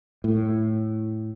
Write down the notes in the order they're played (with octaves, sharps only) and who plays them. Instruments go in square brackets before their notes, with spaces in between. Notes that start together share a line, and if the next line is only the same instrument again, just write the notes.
[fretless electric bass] A2